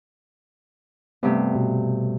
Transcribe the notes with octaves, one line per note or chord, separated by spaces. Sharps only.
G2 C3 A3 B3
B2